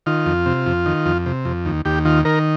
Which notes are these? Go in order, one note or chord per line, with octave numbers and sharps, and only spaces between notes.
D#3 F4
F2
C3
F2
D#3
F2
C3
F2
D#2
D#2 G4
D#3 F4
D#3 A#4